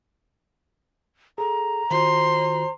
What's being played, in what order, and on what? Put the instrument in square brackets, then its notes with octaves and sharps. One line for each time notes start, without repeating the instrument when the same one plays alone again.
[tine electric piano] G#4 A4 [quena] A#5
[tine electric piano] D#3 F4 F#4 [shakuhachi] C5 [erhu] C6